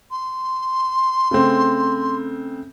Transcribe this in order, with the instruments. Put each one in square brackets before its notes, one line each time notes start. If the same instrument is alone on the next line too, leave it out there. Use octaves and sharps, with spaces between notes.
[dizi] C6
[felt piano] C#3 A3 C4